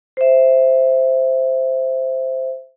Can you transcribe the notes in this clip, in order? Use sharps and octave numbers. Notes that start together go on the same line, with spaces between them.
C5 E5